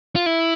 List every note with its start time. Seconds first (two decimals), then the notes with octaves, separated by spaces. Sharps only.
0.16 F4
0.26 E4